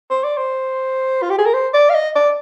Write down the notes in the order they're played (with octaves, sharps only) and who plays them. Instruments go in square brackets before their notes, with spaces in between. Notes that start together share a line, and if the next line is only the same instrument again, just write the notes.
[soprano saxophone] C5
D5
C5
F4
G4
G#4
A#4
C5
D5
F5
D#5
D5